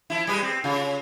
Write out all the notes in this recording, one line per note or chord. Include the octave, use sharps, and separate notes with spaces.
F3 E4
G3 G#3 B4
C4
C#3 F4